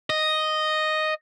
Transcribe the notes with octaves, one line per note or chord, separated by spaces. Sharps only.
D#5